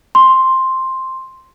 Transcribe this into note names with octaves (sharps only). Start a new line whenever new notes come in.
C6